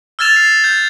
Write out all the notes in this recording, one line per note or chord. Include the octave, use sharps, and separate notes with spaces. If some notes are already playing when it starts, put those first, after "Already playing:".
E6 F6 G#6 A6 E7 F7
C7
G6 G#6